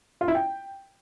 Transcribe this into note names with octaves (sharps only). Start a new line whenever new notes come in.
F4
E4
G5